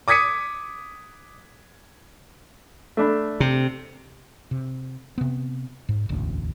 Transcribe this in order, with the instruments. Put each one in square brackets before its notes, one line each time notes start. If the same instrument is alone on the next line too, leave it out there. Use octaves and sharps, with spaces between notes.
[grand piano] D6 D#6 G#6 B6 C#7 D#7
[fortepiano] A3 D4 B5
[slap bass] C3
[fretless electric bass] C3
C3 B3
G#2
E1 A1 D2